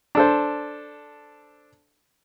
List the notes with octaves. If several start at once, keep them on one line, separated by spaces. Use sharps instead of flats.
D4 A4 C5